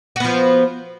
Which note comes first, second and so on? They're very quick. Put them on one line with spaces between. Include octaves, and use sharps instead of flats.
F#4 B3 F3